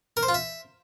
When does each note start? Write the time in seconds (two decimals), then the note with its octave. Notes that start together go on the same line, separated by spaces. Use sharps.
0.17 A#4
0.23 C5
0.29 F4
0.34 E5